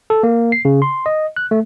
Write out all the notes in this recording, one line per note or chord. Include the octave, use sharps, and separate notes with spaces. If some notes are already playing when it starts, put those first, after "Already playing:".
A4
A#3
C7
C#3
C6
D#5
F#6
A3